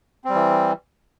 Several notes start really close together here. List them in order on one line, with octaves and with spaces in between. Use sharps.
C4 G3 E3